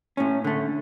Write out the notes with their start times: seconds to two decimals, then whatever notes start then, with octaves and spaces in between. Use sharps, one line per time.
0.17 A2 C#4
0.44 D3 A3